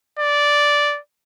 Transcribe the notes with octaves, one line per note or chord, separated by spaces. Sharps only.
D5